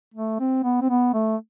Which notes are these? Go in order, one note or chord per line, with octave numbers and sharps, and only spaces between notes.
A3
C4
B3
C4
B3
A3